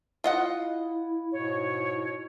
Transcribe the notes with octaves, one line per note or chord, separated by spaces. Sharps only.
E4 F4 D#5 F#5
G#2 B2 C#5